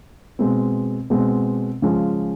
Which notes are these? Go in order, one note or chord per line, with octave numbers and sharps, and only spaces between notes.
B2 G#3 C4
B2 G#3 C4
C#3 F3 G#3 C#4